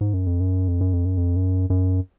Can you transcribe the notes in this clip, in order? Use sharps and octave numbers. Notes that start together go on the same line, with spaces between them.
G#2
F#2
F2
F#2
F2
F#2
F2
F#2
F2
F#2
F#2